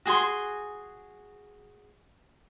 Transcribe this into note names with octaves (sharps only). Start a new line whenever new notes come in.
F#4 G#4 G#5 C6